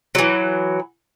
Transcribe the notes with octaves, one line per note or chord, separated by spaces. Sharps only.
E3 F#3